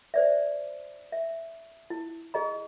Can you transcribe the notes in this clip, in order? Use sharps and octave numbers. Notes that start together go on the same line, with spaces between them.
C5 D5 E5
E5
E4
G#4 D#5 A#5